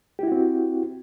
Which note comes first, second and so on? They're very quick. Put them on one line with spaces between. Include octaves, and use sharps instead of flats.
G4 E4 F#4 C4